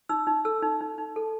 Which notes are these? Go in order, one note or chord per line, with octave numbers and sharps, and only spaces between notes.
D#4 E6
D#4
A4 E6
D#4
D#4
D#4
A4